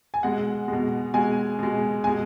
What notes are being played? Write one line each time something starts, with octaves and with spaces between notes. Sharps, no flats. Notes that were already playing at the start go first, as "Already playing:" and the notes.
G#5
B2 G#3 F#5
B2 G#3
B2 G#3 G#5
B2 G#3
B2 G#3 G#5